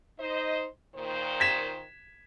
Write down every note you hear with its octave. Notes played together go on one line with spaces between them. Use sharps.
D#4 C5 D#5
A#2 D#3 C5
G#6 B6 E7